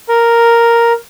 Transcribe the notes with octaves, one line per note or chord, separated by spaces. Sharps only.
A#4